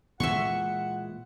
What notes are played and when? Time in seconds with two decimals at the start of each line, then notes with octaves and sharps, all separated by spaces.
0.20 A#2 E3 G#3 E5 F#5 C6 C#6